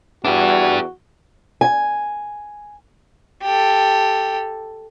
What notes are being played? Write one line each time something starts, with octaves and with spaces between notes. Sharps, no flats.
E2 D4 F#4 G4
G#5
G4 A4